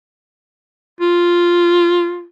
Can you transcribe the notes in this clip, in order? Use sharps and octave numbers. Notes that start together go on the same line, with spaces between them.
F4